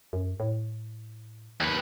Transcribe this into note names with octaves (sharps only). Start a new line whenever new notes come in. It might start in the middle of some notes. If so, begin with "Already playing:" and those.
F#2
A2
D#2 B4